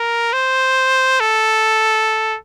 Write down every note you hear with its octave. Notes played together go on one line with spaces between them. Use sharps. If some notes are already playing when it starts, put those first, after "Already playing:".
Already playing: A#4
C5
A4